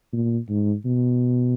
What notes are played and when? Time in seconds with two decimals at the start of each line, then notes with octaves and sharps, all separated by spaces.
0.13 A#2
0.49 G#2
0.85 B2